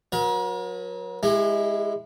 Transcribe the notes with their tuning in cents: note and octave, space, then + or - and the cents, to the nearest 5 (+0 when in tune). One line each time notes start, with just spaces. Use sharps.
F#3 -30 A#4 +40
G#3 +0 E4 +0 G4 +40